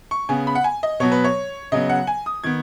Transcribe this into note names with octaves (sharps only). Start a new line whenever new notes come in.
C#6
C#3 B3 G#5
B5
F#5
G#5
D#5
B2 F#3 B3 C#5
B4
C#5
C#3 F#3 B3 D#5
F#5
G#5
D#6
D#3 B3 G#6